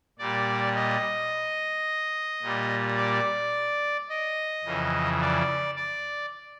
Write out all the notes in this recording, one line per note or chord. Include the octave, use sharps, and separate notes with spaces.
A#2 G3 D5
D#5
A#2 G3
D5
D#5
F2 C#3 E3
D5
D5